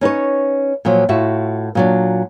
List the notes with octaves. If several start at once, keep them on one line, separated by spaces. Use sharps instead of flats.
C#4 D#4 B4 C#5
A#2 F3 F#3
A2 F4 F#4 E5
A#2 F#3 D4